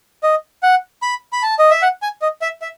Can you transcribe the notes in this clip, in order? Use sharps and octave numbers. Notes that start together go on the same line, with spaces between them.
D#5
F#5
B5
B5
A5
D#5
E5
F#5
G#5
D#5
E5
E5